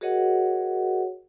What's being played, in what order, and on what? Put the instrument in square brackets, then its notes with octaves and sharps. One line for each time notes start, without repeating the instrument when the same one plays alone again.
[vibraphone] F#4 G#4 A#4 C#5 D#5 F#5